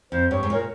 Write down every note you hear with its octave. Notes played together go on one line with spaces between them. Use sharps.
F2 C5
G2 C#5
G#2
A#2 A#4